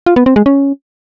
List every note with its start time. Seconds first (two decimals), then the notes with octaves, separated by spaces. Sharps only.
0.06 F4
0.16 B3
0.26 C4
0.36 G#3
0.46 C#4